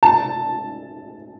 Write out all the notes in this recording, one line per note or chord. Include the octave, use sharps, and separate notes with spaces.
A5